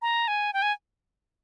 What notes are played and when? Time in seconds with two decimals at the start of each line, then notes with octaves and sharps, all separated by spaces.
0.02 A#5
0.28 G#5
0.53 G5
0.62 G#5